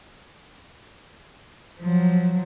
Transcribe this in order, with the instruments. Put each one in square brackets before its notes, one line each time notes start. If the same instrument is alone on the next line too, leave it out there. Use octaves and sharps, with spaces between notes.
[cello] F3 F#3